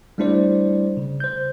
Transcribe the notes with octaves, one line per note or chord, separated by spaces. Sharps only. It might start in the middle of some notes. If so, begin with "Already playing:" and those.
G3 A3 D4 E4 C5 D5
C#3
C5 G6